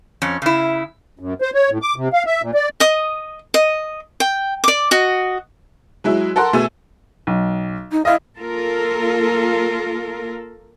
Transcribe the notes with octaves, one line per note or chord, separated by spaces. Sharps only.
F2 C#4
C#3 E4
F#2
C5
C#5
A2
D6
C3
F5
E5
A#2
D5
D#5 D#6
D#5
G5
D5 D6
F#4 D#5
F#3 G#3 E4
A4 A#4 F#5 C6
B2 A3 G#4 E6 D#7
B1
D#4
E4 D#5 F5
A#3 F4 A4 A#4